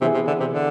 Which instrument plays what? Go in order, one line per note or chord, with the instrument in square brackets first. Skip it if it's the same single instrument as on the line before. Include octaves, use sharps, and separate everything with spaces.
[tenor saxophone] C3 [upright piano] E3 B3 E4 G#4
[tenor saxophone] C3
D3
C3
D3